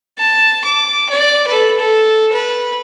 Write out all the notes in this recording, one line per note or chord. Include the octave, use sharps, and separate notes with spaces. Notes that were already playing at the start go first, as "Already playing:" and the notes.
A5
D6
D5
A4 B4
A4
B4